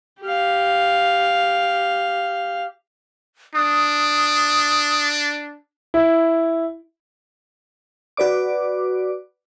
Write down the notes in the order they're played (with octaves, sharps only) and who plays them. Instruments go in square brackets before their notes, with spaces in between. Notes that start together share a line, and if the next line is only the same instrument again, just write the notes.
[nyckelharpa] G4 F5
[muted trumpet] D4 [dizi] D#6
[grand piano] E4
[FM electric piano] F#4 B4 D5 D6